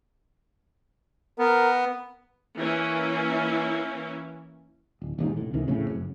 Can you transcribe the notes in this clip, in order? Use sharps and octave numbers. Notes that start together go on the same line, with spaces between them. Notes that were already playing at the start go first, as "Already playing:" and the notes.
B3 A#4
E3 A#3 C#4 E4
D1
D#1 D#2 G#2
F1 A2
C#2 C3 D#3 E3
F2 A2 C#3
F#1 F#2